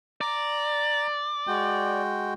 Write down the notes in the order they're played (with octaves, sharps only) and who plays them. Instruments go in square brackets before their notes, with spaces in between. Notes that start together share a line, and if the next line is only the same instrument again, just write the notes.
[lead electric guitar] D5 [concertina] A#5
[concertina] G#3 F#4 G5